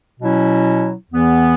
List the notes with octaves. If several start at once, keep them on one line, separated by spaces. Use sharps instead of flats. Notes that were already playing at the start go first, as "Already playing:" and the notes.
B2 F#3 C#4 E4
E2 E3 B3